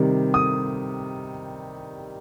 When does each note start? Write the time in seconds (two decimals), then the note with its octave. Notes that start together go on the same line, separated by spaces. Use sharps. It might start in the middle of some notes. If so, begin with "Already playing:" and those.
Already playing: C3 D#3 G3
0.34 D#6